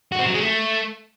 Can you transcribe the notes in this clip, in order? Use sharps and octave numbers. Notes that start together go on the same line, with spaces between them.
F#4
C4
F#3
G#3
A3